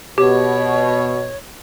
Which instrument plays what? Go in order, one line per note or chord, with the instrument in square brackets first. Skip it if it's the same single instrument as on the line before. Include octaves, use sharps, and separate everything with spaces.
[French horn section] B2 [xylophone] G4 [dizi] C#5